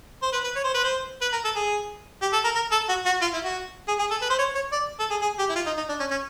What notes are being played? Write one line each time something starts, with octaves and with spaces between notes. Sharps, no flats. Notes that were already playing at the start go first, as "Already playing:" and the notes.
C5
B4
B4
C#5
C5
B4
C5
B4
A#4
A4
G#4
G4
A4
A#4
A#4
A4
F#4
F#4
F4
E4
F#4
G#4
G#4
A4
B4
C5
C#5
C#5
D5
A4
G#4
G#4
G4
E4
F4
D#4
D#4
D4
C#4
C#4